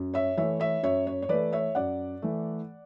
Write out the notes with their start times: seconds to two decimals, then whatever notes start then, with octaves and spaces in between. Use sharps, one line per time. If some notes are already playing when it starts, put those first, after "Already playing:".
Already playing: F#2
0.14 C#5 E5
0.37 E3 A3 C#5 E5
0.60 C#5 E5
0.83 F#2 C#5 E5
1.07 C#5
1.22 C#5
1.29 E3 A3 B4 D5
1.53 C#5 E5
1.75 F#2 D5 F#5
2.22 E3 A3